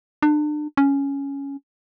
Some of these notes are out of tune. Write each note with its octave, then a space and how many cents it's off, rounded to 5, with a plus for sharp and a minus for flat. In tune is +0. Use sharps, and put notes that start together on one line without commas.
D4 +35
C#4 +5